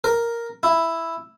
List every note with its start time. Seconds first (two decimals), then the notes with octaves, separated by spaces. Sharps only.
0.04 A#4
0.63 E4